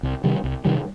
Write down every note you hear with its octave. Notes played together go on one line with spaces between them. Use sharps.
C2
C3 D#3 G3
C2
C3 D#3 G3